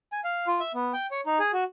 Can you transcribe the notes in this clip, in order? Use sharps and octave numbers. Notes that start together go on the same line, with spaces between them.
G#5
F5
F4
E5
B3
G5
C#5
D#4
G#4
F#4